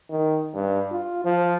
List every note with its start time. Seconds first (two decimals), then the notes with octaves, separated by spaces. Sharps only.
0.10 D#3
0.54 G2
0.91 F4
1.25 F3